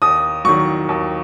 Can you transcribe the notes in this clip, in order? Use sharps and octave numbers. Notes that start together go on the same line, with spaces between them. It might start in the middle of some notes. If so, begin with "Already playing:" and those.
D#2 D#6
D#3 F#3 C#6
D#2